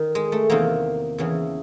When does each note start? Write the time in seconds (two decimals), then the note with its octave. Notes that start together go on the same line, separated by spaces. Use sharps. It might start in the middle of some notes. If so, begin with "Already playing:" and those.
Already playing: D#3
0.15 G#3
0.32 A3
0.50 E2 C3 D#3 A#3
1.18 E2 C#3 E3